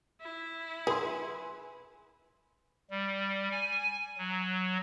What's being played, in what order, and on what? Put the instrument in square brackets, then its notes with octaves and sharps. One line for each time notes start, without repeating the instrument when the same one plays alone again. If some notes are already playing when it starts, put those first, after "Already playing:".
[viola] E4
[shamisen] G#4 [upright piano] B4 G#5 C6
[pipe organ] G3
G#5
F#3